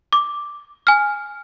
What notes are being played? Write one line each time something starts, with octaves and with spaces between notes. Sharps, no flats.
D6
G#5 F6